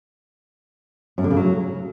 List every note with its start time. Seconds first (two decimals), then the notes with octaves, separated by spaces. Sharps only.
1.18 F#2
1.24 D3
1.30 C#3
1.37 F#3